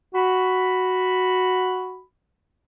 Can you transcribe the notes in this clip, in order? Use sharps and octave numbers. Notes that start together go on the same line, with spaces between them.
F#4 B5